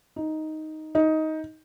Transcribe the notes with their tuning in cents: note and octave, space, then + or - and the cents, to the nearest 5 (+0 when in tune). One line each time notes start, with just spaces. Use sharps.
D#4 +5
D#4 +15